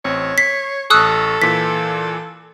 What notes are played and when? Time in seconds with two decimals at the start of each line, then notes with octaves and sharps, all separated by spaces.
0.05 A1 C4 C#5
0.38 B6 C7
0.90 A1 A4 C#6 D#6 E6 F#6
1.42 A#2 E3 B6